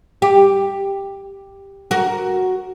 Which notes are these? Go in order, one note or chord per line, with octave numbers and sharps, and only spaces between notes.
G4
F#4 A#4